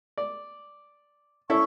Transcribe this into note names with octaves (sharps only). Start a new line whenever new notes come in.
D5
C#4 E4 A4 C#6